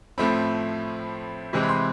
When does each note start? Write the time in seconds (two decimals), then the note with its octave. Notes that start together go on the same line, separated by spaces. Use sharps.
0.18 A2 F3 A3 C4 B5
1.53 C3 E3 G#3 C4
1.63 B5
1.69 C6